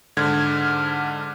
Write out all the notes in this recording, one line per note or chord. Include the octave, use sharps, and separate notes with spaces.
G#2 D3 F6 G#6